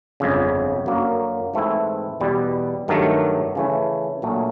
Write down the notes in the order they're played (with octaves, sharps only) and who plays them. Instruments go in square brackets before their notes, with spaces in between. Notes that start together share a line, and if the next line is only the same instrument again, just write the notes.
[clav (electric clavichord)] G1 F2 C#3
F#2 D3 F#3 A#3
G#2 E3 A3 C4 E4
E2 B2 G3
G2 D#3 F#3 A3
C#3 E3 A3
A#1 A#2 F#3 A3